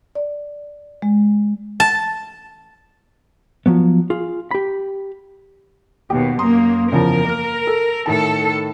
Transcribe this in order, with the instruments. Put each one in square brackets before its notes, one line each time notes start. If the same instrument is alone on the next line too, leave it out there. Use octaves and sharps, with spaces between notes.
[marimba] D5
G#3
[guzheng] A5
[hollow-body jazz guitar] F3 F#3 B3
F4 G#4
G4 B5
[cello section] D#2 B2 [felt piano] G4
[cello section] F#2 A#3 [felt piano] A#5 C6 D#6
[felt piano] E2 C#3 F3 [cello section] A#4
[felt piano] A#3 F6
A4
[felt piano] A2 D#3 A5 [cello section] A4